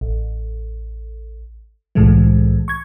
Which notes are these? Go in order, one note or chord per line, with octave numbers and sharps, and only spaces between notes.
A1
C2 A2 E3 G#3 A3
C#6 G#6